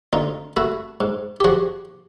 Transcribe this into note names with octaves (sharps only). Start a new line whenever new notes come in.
D2 D#4 F4
A3 E4 F#4
G#2
G4
F3 F#4 G#4